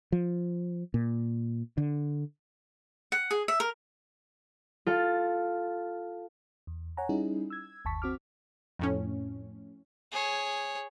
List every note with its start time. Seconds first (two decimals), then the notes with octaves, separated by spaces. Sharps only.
0.12 F3
0.94 A#2
1.77 D3
3.12 F#5
3.31 G#4
3.48 E5
3.60 A#4
4.86 F4 A4 F5
6.67 E2
6.97 C#5 F#5 G#5 A#5
7.09 G3 C#4 D#4 E4 G#4
7.50 E6 G#6
7.85 G1 D#2 A5 C#6 B6
8.02 C4 F#4 D6 F6
8.79 F2 A2 C#4
10.12 G#4 C#5